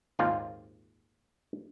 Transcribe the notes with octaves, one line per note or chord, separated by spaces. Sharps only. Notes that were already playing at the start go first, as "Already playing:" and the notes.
G#1 D#2 A#2 C4 F4 F5